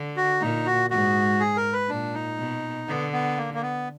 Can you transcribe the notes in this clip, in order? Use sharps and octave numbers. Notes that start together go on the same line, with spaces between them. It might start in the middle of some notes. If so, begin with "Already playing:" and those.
Already playing: D3
F#4
A#2 D#4
F#4
G#2 F#4
G#4
A#4
B4
A#2 D4
D#4
B2
D3 B3
B3
A#3
A#3
B3